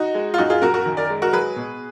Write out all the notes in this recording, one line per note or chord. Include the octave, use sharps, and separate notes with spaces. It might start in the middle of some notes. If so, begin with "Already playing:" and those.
Already playing: D#4 F#4
G#3
F4
F#2 D#4 F#4
F4 G#4
F#2 F#4 A#4
F#4 A#4
D#3
A#4 D5
G#3
F#4 A#4
F#3 G#4 B4
B2